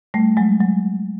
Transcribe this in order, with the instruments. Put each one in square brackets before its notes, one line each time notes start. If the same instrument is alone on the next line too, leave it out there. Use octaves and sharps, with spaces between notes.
[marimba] G3 A3
F#3 G#3
F#3